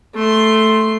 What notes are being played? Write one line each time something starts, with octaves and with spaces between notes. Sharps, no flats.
A3 C6